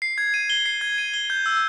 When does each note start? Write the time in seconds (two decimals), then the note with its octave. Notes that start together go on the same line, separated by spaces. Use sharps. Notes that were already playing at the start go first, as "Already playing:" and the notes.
0.02 C7
0.18 G#6
0.34 D#7
0.50 G7
0.66 C7
0.81 G#6
0.98 D#7
1.14 G7
1.30 G6
1.46 E6